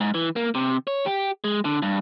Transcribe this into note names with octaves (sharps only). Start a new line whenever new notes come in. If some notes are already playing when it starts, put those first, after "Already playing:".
G#2
E3
A#3
C3
C#5
G4
G#3
D3
G2